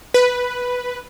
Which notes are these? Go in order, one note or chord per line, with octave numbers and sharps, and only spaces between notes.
B4